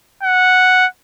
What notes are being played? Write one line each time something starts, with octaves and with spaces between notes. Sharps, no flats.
F#5